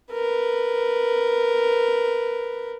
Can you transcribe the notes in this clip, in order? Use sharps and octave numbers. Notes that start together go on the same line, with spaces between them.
A#4 B4